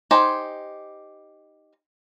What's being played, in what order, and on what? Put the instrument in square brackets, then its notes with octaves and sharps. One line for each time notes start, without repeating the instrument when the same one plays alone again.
[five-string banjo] D#4 G4 C5 G#5